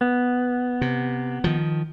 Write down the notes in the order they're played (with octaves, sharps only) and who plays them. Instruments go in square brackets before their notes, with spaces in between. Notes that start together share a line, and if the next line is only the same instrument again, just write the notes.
[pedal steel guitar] B3
[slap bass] C3
D#3 F3